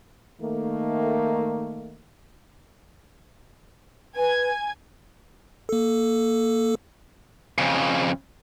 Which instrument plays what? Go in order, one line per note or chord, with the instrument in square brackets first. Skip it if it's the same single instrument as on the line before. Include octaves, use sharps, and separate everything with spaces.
[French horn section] D#3 A3 A#3
[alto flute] B4 [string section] G#5 G#6
[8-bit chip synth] A#3 A4
[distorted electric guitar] F2 C#3